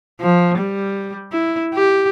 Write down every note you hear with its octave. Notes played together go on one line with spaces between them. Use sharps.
F3
G3
E4
G4